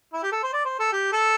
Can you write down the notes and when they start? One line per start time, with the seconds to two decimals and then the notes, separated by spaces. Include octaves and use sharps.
0.13 E4
0.23 G4
0.32 A4
0.43 C5
0.53 D5
0.65 C5
0.80 A4
0.92 G4
1.13 A4